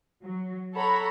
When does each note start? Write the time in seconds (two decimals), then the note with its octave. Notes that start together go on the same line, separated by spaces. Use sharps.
0.23 F#3
0.74 A4 C#5 F#5 A#5 B5